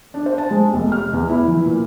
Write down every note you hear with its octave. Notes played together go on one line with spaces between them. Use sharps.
D4
C5
A5
G#3
F1
F6
E2
E4
E3
A#2